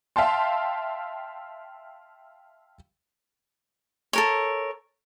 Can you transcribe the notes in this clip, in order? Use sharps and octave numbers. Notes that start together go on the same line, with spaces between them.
E5 F5 G5 A5 C6
A4 A#4 C#5